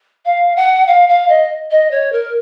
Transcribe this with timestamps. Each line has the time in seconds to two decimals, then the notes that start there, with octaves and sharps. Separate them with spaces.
0.25 F5
0.56 F#5
0.88 F5
1.09 F5
1.29 D#5
1.71 D#5
1.91 C#5
2.12 A#4